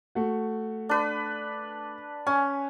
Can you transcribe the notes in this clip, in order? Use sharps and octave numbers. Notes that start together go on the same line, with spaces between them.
A3 F#4
D4 B4
C#4 G#5